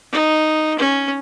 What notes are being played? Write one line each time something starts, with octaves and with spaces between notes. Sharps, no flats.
D#4
C#4